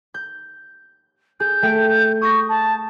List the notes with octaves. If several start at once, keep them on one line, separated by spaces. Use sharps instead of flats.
G6
G#4 G6
A3 G5 D7
C#6 D#6 G6 A#6
A5